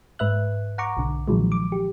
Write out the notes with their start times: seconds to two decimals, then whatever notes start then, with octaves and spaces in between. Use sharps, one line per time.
0.19 G#2 B4 E5 F#6
0.78 F#5 A#5 C#6 D6
0.97 B1 D3
1.28 A#2 D#3 F3 F#3 G#3
1.52 D6
1.72 G4